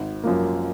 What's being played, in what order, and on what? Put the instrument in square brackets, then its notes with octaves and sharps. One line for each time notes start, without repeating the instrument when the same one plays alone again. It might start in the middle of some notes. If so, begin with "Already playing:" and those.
Already playing: [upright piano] G#1
F#2 F3 A#3